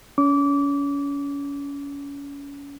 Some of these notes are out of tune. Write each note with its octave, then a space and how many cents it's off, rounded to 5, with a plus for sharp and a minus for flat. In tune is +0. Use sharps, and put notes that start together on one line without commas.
C#4 +30 D6 -25